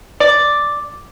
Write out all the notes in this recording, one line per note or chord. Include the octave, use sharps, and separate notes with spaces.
D5